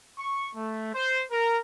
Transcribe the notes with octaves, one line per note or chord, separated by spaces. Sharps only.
C#6
A3
C5
A#4